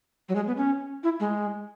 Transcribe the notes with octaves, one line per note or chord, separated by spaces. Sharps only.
F#3
G#3
B3
C#4
E4
G#3